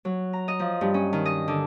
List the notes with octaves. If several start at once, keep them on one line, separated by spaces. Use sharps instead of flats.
F#3
A#5
D#5
F3
G2
C#4
D#3
D#5
D3